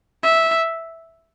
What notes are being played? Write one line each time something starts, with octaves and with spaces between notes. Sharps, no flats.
E5